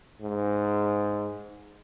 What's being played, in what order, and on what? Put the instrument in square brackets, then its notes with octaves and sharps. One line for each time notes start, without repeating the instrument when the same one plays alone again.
[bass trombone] G#2